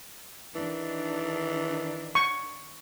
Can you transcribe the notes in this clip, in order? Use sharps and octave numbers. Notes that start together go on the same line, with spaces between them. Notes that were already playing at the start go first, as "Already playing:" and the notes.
D#3 E3 D4
C#6